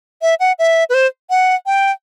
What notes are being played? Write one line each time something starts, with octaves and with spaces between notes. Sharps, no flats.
E5
F#5
E5
B4
C5
F#5
G5